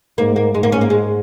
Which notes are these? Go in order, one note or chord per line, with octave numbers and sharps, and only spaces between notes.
G#2 A#3
A#3
G#2 G#3
A#3
C#4
A#3
G#3